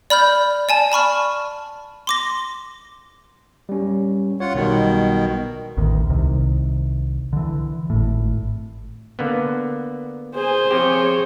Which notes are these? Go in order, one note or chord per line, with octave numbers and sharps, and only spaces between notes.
D5 B5 F6 G6
D5 G#5 A5
A5 B5 C#6 F6
C6 D6 A#6
G3 C#4
F4 C#5 F#5
B1 B2 D#3 G3
A1 D2 D#3
C2 C3 D#3
D3 E3
G#1 A2
D3 A#3 B3
G#4 C5 G#5
F3 C4 G4 G#4 C#5